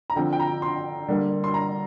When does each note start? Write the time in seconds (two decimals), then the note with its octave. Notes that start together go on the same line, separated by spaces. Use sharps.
0.10 A#5
0.16 D3 F3 C4 G5
0.33 G5
0.40 A#5
0.62 C6
1.09 D3 G3 A#3
1.44 C6
1.54 A#5